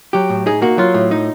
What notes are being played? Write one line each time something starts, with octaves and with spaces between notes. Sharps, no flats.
F#3 G4
A2
D#4 G#4
A#3 F#4
F#3 F4
A2
D#4